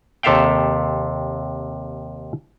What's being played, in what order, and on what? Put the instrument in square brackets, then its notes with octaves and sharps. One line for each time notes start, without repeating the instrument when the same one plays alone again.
[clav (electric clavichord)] D#2 C3 A4 E5 F5 G5